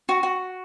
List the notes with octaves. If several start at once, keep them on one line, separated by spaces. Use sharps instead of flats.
F#4
F#4